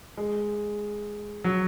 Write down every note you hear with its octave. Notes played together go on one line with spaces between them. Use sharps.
G#3
F#3